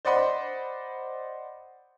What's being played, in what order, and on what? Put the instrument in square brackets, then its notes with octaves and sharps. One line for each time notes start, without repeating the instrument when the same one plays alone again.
[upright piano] C5 D5 D#5 F#5 B5 C6